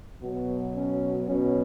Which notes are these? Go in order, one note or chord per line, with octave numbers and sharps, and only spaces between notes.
B2 F#3 B3
C#4
B2 F#3 C#4